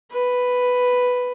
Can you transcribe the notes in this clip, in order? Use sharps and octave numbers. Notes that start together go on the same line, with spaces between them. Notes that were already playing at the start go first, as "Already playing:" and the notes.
B4